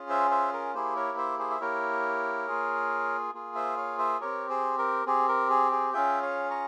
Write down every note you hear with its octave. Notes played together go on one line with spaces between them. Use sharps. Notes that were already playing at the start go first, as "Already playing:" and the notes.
Already playing: C#4 F4 G#4
C5 E5
C5 E5
A#4
A#3 E4 G4 G#4 C5
A#4 C#5
C5 E5
G#4 C5
E5
A#3 E4 G4 A#4 C#5
A#3 F4 G#4
A#3 F4 G#4
C5 E5
C#5 F5
C5 E5
C4 G4 A#4 C#5
G#4 C5
A#4
C4 G4 G#4
A#4
G#4
G#4
C#4 F4 G#4 E5 G5
C#5 F5
A#5 C#6